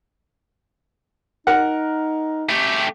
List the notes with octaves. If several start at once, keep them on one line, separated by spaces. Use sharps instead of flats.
D#4 A#4 F#5
A3 G4